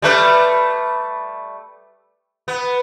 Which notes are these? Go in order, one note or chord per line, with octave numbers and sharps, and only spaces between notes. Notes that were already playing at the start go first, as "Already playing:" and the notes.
G3 A3 B4
B3